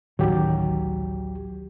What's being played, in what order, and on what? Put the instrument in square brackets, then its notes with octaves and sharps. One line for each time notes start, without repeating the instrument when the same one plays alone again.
[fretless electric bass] D1 A1 D#3 [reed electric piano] F#3 G4